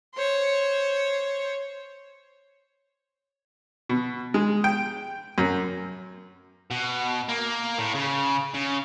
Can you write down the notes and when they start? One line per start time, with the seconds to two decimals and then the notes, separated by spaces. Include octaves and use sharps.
0.15 C5 C#5
3.89 B2
4.34 G#3
4.64 G5
5.38 F#2
6.71 B2
7.29 A#3
7.79 A2
7.95 C#3
8.54 C#3